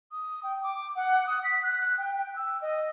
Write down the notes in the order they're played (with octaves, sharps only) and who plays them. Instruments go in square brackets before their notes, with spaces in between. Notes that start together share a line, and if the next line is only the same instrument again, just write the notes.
[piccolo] D#6
G5
D6
F#5
D#6
B6
F#6
F#6
G5
G5
E6
D#5